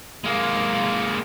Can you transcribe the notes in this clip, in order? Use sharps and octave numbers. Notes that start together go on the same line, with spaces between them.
G#3 A#3